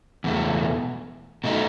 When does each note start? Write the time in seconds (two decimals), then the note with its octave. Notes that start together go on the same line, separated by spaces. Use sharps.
0.24 E2 B2 A3
1.44 B2 A3 D#4